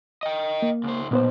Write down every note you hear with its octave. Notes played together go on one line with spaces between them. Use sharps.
D#5 G5
A#3
C#2 C5
B1 A#2 B3 C5